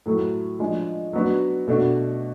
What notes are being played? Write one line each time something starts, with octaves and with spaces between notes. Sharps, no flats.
A2 F#3 A3
F3 G#3 D4
F#3 B3 D4 F#4
B2 A3 D4 F#4